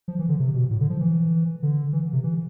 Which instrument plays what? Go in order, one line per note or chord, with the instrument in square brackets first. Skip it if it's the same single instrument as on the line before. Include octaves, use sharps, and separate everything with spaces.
[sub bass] F3
E3
D3
C3
B2
A2
D3
F3
E3
D3
E3
C3
E3